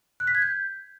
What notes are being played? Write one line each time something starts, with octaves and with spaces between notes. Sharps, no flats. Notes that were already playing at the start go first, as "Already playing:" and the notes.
F#6
B6
G#6
G6